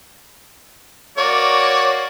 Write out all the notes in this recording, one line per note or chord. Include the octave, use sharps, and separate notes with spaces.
A#3 F#4 C#5 D5